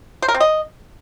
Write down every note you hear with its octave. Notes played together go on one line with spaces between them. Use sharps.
C5
A#4
C4
D#5